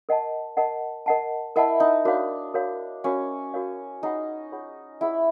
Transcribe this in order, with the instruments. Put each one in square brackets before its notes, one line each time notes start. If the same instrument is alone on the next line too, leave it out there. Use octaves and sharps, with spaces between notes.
[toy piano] A#4 D#5 F#5 A5
A#4 D#5 F#5 A5
A#4 D#5 F#5 A5
[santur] E4 [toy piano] A#4 D#5 F#5 A5
[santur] D#4
[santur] D4 [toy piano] F#4 A#4 C#5 F5
[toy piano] F#4 A#4 C#5 F5
[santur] C#4 [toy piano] F#4 A#4 C#5 F5
[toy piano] F#4 A#4 C#5 F5
[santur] D#4 [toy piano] F4 G#4 C#5 F#5 B5
[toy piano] F4 G#4 C#5 F#5 B5
[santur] E4 [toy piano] F4 G#4 C#5 F#5 B5